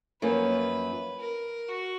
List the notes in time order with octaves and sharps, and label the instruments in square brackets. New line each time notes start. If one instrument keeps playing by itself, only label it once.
[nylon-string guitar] F#2 F3 A#3 C#4 [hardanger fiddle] B4
[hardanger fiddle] A#4
F#4